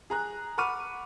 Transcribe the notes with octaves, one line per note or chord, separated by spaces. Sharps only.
G#4 A#5 F#6
F#5 B5 C#6 D6 F6 D#7